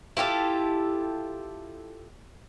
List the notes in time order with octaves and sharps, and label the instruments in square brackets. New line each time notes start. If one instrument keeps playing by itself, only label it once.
[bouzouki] E4 F4 G4 A4